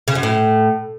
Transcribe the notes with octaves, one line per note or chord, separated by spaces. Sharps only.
C#3
F#2
A2